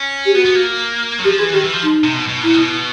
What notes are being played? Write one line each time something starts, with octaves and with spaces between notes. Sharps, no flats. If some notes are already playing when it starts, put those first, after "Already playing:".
Already playing: C#4
G4
B3 F#4
B3
A#3
F#3
F3 G4
E3 G#4
D#3 G4
E3
F3
D#4
C3
B2
B2
A#2 E4
C3
B2